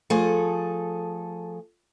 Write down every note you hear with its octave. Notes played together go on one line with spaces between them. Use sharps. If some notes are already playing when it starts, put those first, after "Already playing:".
F3 A3 G#4 A4